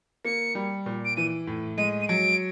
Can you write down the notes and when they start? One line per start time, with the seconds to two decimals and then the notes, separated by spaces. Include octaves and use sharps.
0.25 A#3 C#7
0.55 G3
0.86 A#2
1.05 D7
1.17 E3 D#7
1.47 A2
1.78 G#3 D#7
2.01 D#7
2.08 F#3 D7